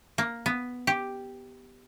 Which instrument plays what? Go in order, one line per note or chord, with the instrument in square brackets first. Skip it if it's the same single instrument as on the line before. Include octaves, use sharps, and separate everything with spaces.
[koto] A#3
B3
G4